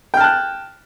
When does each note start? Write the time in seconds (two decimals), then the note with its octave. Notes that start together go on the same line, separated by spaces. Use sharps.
0.14 G5
0.17 F6
0.20 A5
0.24 F#6